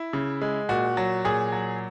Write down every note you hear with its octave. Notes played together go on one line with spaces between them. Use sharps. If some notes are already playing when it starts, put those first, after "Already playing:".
Already playing: E4
C#3
G#3
A#2 F#4
F#3
A#2 G#4
F#3